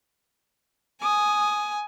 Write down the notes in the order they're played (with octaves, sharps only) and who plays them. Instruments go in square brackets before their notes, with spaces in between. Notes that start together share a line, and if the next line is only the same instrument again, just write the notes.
[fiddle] G#5 [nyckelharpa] D#6